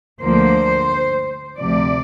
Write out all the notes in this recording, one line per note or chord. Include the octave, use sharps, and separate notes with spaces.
D2 D3 F3 A#3 C5
D2 C3 F3 D5